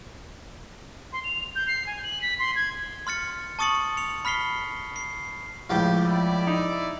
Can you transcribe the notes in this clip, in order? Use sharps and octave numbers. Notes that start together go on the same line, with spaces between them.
C6
F7
G6
C7
G#5
F#7
B6
C6
G#6
C6 F6 A6 C#7
A5 C#6 D#6 A6 C#7 F#7
C#7 F7
B5 F6 B6 C7 G7
C7
C#2 A2 F3 G4
E4 D5
D#4